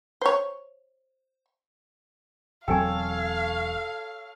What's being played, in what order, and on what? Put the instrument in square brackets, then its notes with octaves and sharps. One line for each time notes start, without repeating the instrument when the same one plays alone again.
[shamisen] C5 C#5
[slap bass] E1 F#3 C4 [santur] A4 C#5 [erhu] F5 [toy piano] G5 G#5